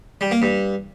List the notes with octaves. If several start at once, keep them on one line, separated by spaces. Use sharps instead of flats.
G3
A#3
G2